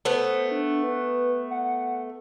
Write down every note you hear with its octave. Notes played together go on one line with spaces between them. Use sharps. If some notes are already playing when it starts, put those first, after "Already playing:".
A3 B3 C5
D4
B4
F#5